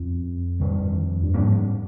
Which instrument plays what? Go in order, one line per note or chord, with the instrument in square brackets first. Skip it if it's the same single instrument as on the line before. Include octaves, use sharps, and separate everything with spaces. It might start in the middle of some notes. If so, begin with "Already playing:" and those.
Already playing: [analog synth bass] F2
[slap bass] G2 D#3 G3
[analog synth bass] G2
[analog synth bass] F2 [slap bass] G#2 G3 A#3